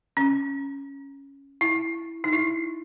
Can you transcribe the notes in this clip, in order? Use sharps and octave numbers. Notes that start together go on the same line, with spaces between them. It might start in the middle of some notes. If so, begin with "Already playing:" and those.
C#4
E4
D#4
E4